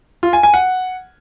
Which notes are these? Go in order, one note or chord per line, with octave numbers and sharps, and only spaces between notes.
F4
G#5
G#5
F#5